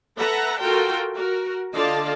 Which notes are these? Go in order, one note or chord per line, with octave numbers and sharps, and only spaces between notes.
A4 B4 E5 F#5 A#5
F4 F#4 A4 A#4 G5
F#4 A#4
D3 F4 D5 D#5 F5 A5